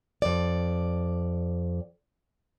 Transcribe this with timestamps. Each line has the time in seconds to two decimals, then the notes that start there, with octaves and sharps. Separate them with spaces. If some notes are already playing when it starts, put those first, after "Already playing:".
0.22 F2 D5